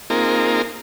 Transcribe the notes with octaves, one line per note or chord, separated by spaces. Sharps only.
A#3 C4 D#4 F4 G#4 A#4